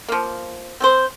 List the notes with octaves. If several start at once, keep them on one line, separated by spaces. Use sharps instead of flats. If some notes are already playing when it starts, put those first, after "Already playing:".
F3 A#3
C4 G#4 C5